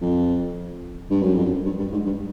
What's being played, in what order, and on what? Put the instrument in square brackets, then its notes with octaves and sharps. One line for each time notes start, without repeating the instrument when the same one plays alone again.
[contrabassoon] F2
G2
F#2
F2
F#2
G2
G2
G#2
G2